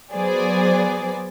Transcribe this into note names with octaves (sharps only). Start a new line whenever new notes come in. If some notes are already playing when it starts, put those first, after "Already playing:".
F#3 B3 G#4 C5 D5